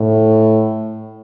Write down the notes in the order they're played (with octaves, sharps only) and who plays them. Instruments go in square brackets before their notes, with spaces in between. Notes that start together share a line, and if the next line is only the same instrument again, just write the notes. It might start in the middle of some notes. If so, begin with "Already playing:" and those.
Already playing: [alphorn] A2